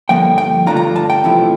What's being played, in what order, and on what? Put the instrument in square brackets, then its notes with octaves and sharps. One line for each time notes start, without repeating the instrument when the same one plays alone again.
[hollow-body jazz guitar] G2 D3 F3 A#3 G5
G5
G2 D3 A3 D4 F4 A#5
A#5
A5
G5
E2 C3 F3 A3 E4